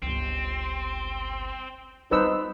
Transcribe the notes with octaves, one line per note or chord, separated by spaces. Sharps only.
G1 C#2 C4
G3 C4 D#4 B4 C5 E6